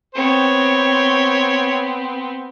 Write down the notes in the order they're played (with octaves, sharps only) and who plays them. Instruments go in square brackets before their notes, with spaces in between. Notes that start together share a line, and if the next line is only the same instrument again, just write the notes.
[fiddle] B3 C4 [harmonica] C#5